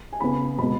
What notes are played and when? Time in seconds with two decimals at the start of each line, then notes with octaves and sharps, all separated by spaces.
0.13 G#5
0.20 C#3 B3 B5
0.59 B2 G#3 B3 B5